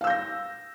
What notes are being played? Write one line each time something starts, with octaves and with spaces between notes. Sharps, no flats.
F5 E6 G6 A#6